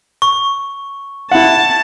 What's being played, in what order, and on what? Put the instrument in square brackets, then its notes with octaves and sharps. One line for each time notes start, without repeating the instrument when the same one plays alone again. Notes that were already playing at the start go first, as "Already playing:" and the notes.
[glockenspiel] C#6
[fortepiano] E4 F#5 [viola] A5